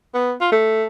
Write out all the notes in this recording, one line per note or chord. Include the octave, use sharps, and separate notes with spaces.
B3
F4
A3